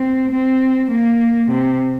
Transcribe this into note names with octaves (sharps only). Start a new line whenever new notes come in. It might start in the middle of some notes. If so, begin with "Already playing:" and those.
Already playing: C4
C4
A#3
C3